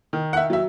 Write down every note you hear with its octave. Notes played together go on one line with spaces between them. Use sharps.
D#3
F#5
E5
F#3 E5